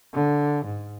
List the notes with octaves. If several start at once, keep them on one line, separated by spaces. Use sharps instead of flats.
D3
G#2